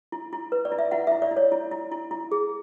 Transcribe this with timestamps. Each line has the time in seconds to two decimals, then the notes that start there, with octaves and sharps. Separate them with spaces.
0.12 E4
0.33 E4
0.52 B4
0.65 D5
0.72 E4
0.79 E5
0.91 E4 F#5
1.07 E4 E5
1.22 D5
1.31 E4
1.37 C#5
1.52 E4
1.71 E4
1.92 E4
2.11 E4
2.32 G#4